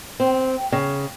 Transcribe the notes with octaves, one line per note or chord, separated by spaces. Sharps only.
C4
C#3